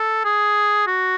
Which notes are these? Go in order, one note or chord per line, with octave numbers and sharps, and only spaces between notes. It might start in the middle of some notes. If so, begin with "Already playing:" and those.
Already playing: A4
G#4
F#4